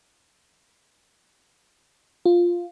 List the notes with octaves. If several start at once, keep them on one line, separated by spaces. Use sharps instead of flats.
F4